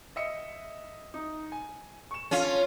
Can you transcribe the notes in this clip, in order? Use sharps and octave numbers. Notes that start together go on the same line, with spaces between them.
D#5 E5 C#7
D#4
G#5
C#6 E7
C#4 F4 A4